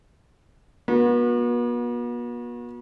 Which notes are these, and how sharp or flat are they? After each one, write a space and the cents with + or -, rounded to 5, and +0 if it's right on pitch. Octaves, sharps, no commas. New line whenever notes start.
B3 -45 F#4 -35